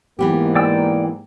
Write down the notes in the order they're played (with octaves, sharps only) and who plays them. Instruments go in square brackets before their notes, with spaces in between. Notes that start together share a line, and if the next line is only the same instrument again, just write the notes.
[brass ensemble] G#2 A#3 [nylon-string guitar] E3 B3 G4
[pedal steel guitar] D5 G5 E6